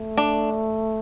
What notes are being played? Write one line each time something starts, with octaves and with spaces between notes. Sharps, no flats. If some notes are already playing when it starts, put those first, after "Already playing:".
Already playing: A3
D4